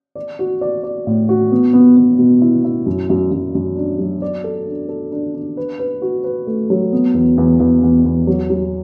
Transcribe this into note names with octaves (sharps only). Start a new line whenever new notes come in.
D5
F#4
D5
D5
A2
F#4
B3
B3
B3
B2
E4
E4
F#2
F#2
F#2
F#2
D4
F#3
D5
A4
D4
A4
D4
D4
B4
B4
F#4
B4
A3
F#3
B3
E2
E2
E2
E2
E2
F#3
F#3